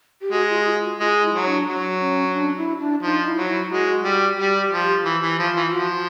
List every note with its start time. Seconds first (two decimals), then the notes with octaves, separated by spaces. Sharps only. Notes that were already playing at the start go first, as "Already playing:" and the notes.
0.22 G4
0.32 G#3 F#4
0.49 F4
0.66 F4
0.82 F#4
0.99 G#3 F4
1.23 E4
1.34 F#3
1.45 D4
1.67 F#3
2.00 C#4
2.34 D4
2.58 E4
2.80 D4
3.03 F3 D#4
3.25 E4
3.37 F#3
3.48 E4
3.69 G#3 F#4
4.03 G3
4.37 G3 G4
4.59 G4
4.71 F3
4.82 G4
5.05 E3
5.22 E3
5.39 F3 F4
5.56 E3
5.72 F3 F#4